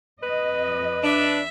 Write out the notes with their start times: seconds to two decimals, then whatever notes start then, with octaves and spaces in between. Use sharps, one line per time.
0.23 F2 B4 D#5
1.03 D4 E5